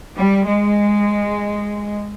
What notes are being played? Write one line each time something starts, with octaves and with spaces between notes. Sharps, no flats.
G3
G#3